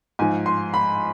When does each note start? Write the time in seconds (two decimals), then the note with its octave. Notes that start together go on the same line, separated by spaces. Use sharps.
0.19 G#2 F3 G#5
0.46 C6
0.74 B5